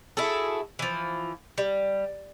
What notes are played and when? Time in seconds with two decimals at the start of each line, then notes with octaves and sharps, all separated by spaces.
0.17 E4 F#4 G#4 A4
0.79 E3 F3
1.58 G3